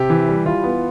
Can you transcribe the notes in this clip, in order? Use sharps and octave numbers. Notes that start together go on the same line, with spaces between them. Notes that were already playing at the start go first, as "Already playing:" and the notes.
Already playing: C3 G4
E3
G3
E3 F4
B3